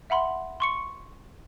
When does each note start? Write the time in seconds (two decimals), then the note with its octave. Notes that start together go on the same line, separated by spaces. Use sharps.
0.10 E5 F#5 B5 C6
0.60 C6 C#6 C#7